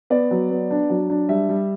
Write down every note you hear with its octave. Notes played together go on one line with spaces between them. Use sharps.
B3 D5
F#3
B3
D4
F#3
D4
G3 E5
G3